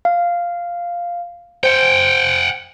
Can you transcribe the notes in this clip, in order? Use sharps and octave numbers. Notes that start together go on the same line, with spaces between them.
F5
C5 F#5 G5